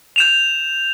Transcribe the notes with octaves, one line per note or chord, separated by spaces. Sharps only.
G6 E7 F7